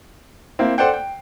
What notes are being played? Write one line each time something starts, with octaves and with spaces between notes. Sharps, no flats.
A#3 C4 E4
A4 C5 D5 F#5 G5
G5